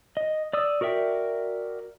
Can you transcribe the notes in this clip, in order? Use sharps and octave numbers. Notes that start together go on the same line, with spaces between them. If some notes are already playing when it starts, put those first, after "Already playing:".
D#5
D5 D#6 E6
F#4 A#4 D5 E5 G5